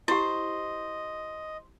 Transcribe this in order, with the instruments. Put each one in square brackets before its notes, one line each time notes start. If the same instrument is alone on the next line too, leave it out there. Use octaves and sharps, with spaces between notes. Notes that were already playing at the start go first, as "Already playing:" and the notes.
[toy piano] E4 G4 [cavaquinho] C5 [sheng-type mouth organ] D#5